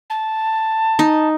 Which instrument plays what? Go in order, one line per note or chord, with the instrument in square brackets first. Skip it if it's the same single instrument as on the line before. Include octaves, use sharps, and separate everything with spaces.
[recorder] A5
[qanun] D#4